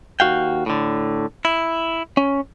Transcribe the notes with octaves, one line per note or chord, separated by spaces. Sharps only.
D#2 E3 F#4 F5 G5
A2 D3
E4
C#4